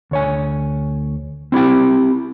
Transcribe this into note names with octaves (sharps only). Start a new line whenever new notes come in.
D2 C#5 G#5
C4 E4 G4 G5